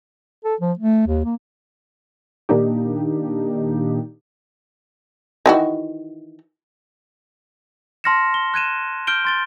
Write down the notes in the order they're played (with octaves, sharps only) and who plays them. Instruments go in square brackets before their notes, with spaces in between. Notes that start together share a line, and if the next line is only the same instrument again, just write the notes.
[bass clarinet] A4
F3
A3
D#2
A#3
[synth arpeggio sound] A#2 D#3 A#3 D4 D#4 G4
[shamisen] D#3 E3 F#4
[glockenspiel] A5 C6 F6 A#6 C#7 E7
G7
F#6 G#6 D#7 E7
F6 G6 D7 G7
C6 A6 G7